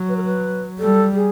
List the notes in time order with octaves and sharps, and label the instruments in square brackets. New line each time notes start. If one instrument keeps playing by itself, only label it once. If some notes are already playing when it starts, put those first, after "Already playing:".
Already playing: [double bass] F#3
[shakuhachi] B4
A#4
B4
[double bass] G3 [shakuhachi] A4
[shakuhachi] G#4